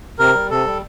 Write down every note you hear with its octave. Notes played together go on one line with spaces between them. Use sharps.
C3 A#4
G3
C3 A4
G3